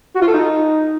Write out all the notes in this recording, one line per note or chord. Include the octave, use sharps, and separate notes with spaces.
F#4
F4
A4
D#4